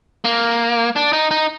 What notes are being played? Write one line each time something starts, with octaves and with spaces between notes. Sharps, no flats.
A#3
D4
D#4
D#4